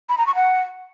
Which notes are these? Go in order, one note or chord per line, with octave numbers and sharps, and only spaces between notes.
B5
A#5
C#6
F#5